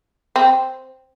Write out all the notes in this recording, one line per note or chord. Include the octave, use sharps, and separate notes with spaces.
C4